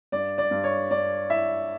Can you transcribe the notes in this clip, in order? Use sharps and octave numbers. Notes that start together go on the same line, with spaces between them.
G2 D5
D5
G2
C#5
G2 D5
E4 E5